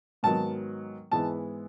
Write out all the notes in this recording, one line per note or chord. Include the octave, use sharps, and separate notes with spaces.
G#2 D#3 F#3 B3 A5
G#2 E3 G#3 B3 A5